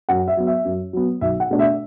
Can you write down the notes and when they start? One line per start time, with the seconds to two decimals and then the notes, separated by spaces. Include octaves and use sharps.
0.09 F#2 F#5
0.28 E5
0.37 F#3 B3
0.47 E5
0.65 F#2
0.93 F#3 B3
1.21 B1 E5
1.40 F#5
1.50 B2 A3 D4
1.59 E5